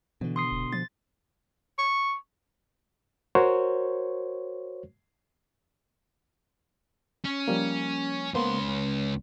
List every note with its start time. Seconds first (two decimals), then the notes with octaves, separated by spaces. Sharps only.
0.21 B2 D3 E3
0.36 C6 D#6 C7
0.52 D#1
0.73 F3 A6
1.78 C#6
3.35 F#4 A#4 C5 C#5
7.25 C#4
7.48 F3 G3 A#3
8.34 C#2 A#3 B3 C5 C6
8.68 C#4